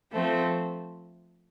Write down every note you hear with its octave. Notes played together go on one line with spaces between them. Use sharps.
F3 A3 C4